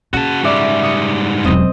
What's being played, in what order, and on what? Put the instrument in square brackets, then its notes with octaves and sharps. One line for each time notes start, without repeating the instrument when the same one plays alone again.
[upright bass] C#3 [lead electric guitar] F#4 A5
[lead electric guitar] G#2 G3 [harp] F#4 D5 E5
[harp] D#6 C#7 D#7
[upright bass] E1 F#3 [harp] C4 D#5